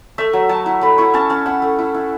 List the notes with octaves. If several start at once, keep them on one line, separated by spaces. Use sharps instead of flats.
A3 E5
F#3
F#3 A5
E4
A3 B5
E4 C#6
C#4 A5
C#4 A5
E4 F#5
A3
E4
E4